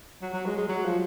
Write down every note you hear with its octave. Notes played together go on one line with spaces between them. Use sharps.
F#3
F#3
G#3
G#3
F#3
F3